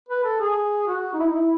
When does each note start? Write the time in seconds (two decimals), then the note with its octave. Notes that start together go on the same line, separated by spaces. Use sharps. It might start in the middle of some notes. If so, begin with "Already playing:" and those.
0.09 B4
0.24 A4
0.40 G#4
0.87 F#4
1.14 D#4
1.19 E4
1.29 D#4
1.35 E4